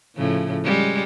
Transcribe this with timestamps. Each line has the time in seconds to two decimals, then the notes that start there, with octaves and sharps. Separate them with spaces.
0.16 A2 C#3 F3
0.65 G3 G#3 C#4